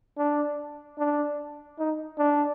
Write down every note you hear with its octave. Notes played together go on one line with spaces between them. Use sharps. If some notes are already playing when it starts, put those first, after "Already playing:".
D4
D4
D#4
D4